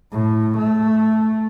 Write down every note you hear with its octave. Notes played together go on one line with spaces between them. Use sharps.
A2
A3